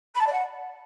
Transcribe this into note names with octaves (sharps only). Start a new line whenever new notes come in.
B5
A5
D5
F#5